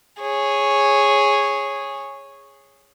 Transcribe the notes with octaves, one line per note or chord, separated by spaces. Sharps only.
G#4 C#5